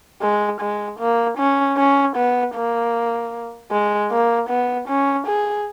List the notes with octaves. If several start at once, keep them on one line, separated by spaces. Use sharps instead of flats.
G#3
G#3
A#3
C#4
C#4
B3
A#3
G#3
A#3
B3
C#4
G#4